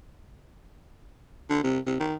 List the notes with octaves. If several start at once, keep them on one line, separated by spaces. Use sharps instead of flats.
D3
C3
C3
D#3